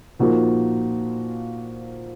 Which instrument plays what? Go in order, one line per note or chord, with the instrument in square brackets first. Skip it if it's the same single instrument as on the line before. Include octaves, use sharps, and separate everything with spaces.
[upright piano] A#2 F3 A#3 D#4 F#4